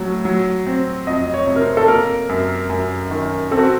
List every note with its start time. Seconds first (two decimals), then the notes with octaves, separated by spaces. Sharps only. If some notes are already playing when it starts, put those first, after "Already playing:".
Already playing: A2 F#3
0.25 F#3
0.66 C4
1.07 F2 D#5
1.34 C#5
1.47 C3
1.56 A#4
1.62 C5
1.77 A4
1.88 A#3 A#4
2.29 F#2
2.70 F#2
3.11 D#3
3.51 C4 A4
3.58 F#4